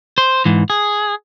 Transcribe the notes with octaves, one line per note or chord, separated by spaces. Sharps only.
C5
G#2 E3
G#4